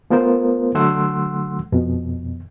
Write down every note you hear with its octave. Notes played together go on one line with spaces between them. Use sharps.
A3 B3 F4 A#4 C5
D3 F#3 A3 F#5 C6 E6
F2 B2